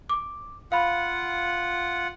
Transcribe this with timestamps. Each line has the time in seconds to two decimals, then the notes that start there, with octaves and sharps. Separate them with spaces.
0.09 D6
0.72 F4 F5 F#5 B5